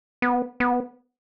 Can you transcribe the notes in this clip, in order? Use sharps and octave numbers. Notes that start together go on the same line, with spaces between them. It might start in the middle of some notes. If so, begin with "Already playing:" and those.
B3
B3